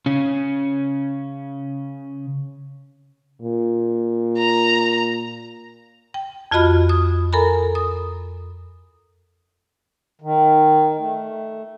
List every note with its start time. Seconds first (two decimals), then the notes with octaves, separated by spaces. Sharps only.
0.06 C#3 C#4
3.42 A#2
4.38 A#5
6.14 G5
6.51 F2 F4 F#4 D#5 B5 F6
6.89 D#6
7.33 A4 A#4 G#5 A#5 B5
7.75 D#6
10.22 D#3
10.98 A3